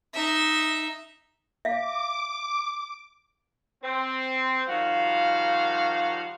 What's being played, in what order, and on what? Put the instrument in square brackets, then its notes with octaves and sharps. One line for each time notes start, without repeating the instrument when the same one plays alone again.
[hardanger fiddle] D#4 E5
[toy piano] E5 F5 [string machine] D6
[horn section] C4
D#3 F3 G3 F#4 F5